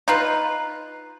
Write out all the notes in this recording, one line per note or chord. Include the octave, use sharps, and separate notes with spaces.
D#4 F4 B4